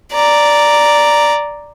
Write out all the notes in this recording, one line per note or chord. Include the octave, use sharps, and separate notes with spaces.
D5 A#5